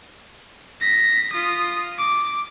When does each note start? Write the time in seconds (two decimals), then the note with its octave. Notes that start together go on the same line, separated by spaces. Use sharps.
0.81 A#6 B6
1.32 F4 D#6
1.98 D6